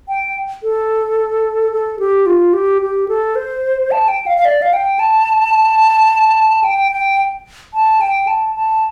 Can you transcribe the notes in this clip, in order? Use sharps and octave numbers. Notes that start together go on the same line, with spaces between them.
G5
A4
A4
G4
F4
G4
G4
A4
C5
A5
G5
F5
F5
D5
F5
G5
A5
G5
G5
A5
G5
A5
A5